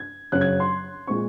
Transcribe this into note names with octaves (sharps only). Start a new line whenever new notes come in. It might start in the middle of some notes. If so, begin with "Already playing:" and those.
Already playing: G#6
F#2 C#3 F#3 C#4 F#6
G#6
C6
A#2 G#3 C4 C#6